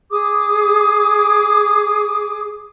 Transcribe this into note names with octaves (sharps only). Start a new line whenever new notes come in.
G#4 D6 D#6